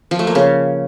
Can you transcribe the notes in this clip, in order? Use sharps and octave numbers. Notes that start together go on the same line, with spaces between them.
F3
A3
A#3
C#3